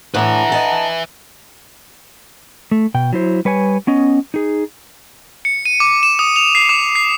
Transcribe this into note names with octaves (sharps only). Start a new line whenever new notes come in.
A2 D4 B4 E5 F#5 A#5
D#5 A5
A3
B2 G5
F#3 E4 C5
G3 B4 C#5 G#5
B3 C#4 D#5
D#4 G#4
C#7
D#7
D6
E7
D#6
F7
C7
D6
C7